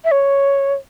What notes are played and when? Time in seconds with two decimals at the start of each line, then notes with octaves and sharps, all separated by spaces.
0.05 E5
0.12 C#5